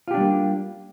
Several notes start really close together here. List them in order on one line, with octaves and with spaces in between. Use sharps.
F4 G4 D4 G3 A#3